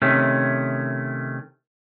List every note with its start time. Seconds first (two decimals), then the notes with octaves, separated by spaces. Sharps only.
0.02 C3 D#3 A3 C#4